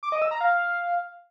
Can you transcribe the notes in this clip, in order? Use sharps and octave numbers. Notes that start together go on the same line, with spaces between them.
D6
D#5
E6
A#5
F5